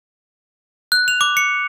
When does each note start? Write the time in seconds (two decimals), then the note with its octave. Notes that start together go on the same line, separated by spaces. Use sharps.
0.92 F#6
1.08 F7
1.21 D6
1.37 C#7